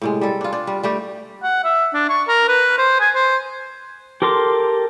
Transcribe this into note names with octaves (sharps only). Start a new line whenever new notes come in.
A2 C3 G#3
G3 A4
D4 F4
D4
G3
G3 A3 G4
F#5
E5
D4
C#6
A#4
B4
C5
G#5
C5
G4 A4 A#4 C6 D6